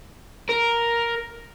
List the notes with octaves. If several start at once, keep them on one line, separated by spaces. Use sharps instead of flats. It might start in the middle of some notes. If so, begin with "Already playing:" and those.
A#4